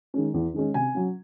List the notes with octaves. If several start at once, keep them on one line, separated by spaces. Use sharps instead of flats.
D#3 G#3 C#4
E2
D#3 G#3 C#4
C3 G#5
F#3 C#4